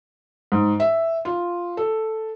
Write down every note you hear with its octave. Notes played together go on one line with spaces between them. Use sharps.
G#2
E5
F4
A4